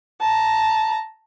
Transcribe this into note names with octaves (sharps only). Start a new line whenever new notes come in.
A5 A#5